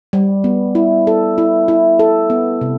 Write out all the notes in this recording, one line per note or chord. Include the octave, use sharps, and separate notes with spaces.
G3
B3
E4
A4
E4
E4
A4
B3
C3